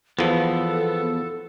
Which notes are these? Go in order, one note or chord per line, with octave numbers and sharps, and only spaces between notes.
E2 F3 B3 A4